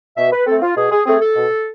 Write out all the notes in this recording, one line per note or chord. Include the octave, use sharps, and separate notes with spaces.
B2 E5
B4
A3 C4 A4
F4
B2 G#4
G#4
A3 C4 G#4
A4
B2